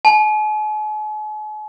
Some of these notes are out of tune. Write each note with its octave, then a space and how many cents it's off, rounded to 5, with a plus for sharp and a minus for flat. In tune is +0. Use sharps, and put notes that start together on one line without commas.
G#5 +45